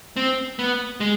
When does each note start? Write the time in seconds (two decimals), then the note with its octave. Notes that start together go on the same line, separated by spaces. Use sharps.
0.16 C4
0.59 B3
1.00 G#3